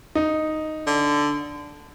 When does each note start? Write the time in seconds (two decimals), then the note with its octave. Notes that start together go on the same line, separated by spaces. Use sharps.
0.15 D#4
0.87 D3